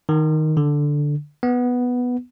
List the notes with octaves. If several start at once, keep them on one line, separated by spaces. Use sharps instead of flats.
D#3
D3
B3